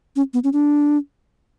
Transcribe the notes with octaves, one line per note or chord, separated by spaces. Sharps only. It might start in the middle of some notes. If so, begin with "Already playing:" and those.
C#4
B3
C#4
D4